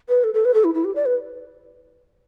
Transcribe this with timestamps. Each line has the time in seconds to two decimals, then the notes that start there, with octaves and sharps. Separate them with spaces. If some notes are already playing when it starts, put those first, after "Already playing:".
0.09 B4
0.24 A4
0.34 A4
0.45 B4
0.54 A4
0.64 E4
0.74 E4
0.84 G4
0.95 D5
1.06 B4